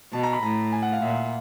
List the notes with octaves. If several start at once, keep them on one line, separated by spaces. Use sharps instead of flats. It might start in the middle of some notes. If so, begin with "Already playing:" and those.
B2 A5
A#5
B5
A2 A#5
G#5
F#5
F5
A#2 E5